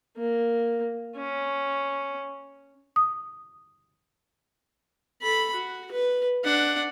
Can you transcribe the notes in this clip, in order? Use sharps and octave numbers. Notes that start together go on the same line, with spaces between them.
A#3
C#4
D#6
A4 B5
F#4
B4
D4 F#5